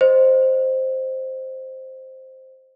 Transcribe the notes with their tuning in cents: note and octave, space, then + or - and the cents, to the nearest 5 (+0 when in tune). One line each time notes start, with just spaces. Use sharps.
C5 +0 D#5 -5